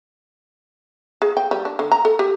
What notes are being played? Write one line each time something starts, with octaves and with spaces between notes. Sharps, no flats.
G#4
G5
G3
D4
D3
A#5
A4
G4